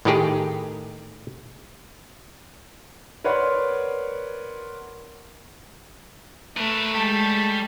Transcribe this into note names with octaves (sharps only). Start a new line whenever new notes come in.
A2 D#3 D#4 G4 G#4
A#4 B4 C#5 D5 F#5 C6
A3 A#4 B4
G3 G#3 G4 A5